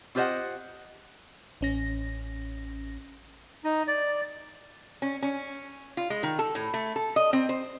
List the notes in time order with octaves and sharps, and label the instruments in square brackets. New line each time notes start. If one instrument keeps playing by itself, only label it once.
[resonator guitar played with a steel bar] C4 F4 G4 C5 D#5 F#5
[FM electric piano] A1 C#4 A#6
[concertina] D#4
D5
[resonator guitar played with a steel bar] C#4
C#4
F4
G#3
D#3
A4
A2
A3
A4
D#5
C4
C5